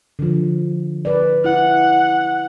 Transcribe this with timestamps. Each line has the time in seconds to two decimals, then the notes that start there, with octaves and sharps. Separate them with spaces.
0.19 D3 F3
1.05 B4 D5
1.44 E4 F#5